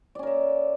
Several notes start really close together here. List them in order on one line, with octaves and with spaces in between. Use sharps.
D5 C#4 A#4 E5